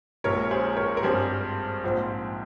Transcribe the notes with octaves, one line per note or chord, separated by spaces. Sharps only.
A#1 A#2 G#3 C#4 A#4 C#5
G#4 C5
A#4 C#5
A#4
G#1 G2 G3 G#4 C5
A#1 G#2 F3 C4